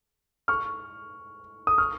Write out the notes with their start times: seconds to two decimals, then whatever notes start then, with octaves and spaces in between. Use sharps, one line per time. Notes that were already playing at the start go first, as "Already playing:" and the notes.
0.48 C#6 F6
1.67 D#6
1.78 C#6 F6